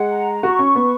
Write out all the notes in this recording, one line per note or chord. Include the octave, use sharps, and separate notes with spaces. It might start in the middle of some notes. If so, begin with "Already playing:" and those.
Already playing: G#3 F#5
A#5
F#4 C#6
C#4
B3 B4